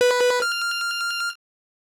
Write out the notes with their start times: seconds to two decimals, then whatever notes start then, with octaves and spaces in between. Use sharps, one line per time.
0.01 B4
0.42 F6